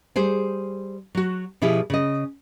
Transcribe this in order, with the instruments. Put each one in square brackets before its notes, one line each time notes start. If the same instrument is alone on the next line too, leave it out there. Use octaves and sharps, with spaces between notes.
[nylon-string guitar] G3 G#4 C5
F#3 F#4
B2 F3 E4 G4 G#4
C#3 D#5